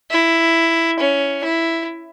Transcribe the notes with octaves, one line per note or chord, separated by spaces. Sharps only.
E4
C#4
E4